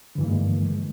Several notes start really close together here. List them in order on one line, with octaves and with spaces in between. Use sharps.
D3 G2 E3 A#3 G#3